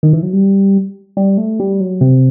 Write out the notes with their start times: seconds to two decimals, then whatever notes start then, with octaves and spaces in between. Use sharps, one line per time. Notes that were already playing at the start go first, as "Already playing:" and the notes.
0.03 D#3
0.13 E3
0.23 F#3
0.33 G3
1.17 G3
1.38 A3
1.60 G3
1.80 F#3
2.01 C3